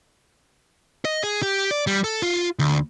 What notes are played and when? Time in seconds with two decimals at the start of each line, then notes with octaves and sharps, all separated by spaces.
1.05 D#5
1.23 G#4
1.42 G4
1.71 D5
1.87 G3
2.04 A4
2.22 F4
2.59 D2